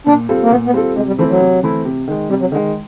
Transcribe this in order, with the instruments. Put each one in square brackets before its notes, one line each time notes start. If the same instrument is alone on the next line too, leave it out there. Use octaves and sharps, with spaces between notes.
[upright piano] A#2 [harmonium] D4
[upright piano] G3 C4 F4 A4
[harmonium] A#3
[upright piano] A#2 [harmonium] B3
[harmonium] B3
[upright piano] G3 C4 F4 A4
[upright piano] C3 [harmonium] G#3
[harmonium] G3
[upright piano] E3 A3 C4 E4 [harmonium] F3
[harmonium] F#3
[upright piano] C3
E3 A3 C4 E4
C3
D#3 G#3
[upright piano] C3 [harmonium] G3
[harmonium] F#3
[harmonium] D3 [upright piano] D#3 G#3